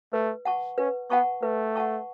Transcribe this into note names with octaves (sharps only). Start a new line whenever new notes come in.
A3 B4
F#5 A5 C#6
C#4 B4
B3 F#5 A5 C#6
A3 B4
F#5 A5 C#6